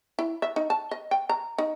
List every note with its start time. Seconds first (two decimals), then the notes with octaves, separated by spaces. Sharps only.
0.19 E4
0.42 E5
0.56 D#4
0.70 A5
0.91 D#5
1.11 G5
1.29 A#5
1.58 D#4